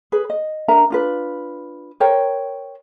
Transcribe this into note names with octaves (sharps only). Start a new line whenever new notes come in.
G#4 B4
D#5
D4 A#4 E5 A#5
D4 F4 B4
A#4 C5 C#5 G5